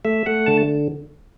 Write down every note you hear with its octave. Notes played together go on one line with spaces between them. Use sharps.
A3 E5
A3 F#5
D3 A5